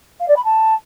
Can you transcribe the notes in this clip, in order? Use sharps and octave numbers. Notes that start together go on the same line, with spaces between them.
F5
D5
B5
A5